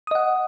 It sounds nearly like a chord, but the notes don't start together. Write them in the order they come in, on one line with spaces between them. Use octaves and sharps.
D#6 D#5 F#5